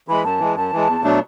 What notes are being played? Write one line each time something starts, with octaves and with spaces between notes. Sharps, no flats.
E3 G#3 B5
F#2 A5
E3 G#3
F#2 A5
E3 G#3
E2
B2 F#3 A3 D4